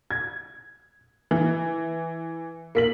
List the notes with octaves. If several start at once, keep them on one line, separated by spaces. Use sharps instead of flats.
G#6
E3
A#3 B6 F#7